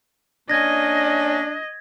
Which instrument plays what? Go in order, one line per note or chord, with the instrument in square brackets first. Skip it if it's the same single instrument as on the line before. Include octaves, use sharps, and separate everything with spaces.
[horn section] A#3 C#4 [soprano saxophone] D4 [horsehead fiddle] D#5 [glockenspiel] G#6 A#6